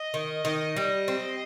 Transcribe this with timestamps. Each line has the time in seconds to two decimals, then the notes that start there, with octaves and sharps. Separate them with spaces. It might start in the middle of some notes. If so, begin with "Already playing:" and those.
Already playing: D#5
0.14 D#3
0.45 D#3 D#5
0.77 G3
1.08 C4